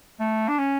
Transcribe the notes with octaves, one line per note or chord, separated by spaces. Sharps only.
A3
D4
C#4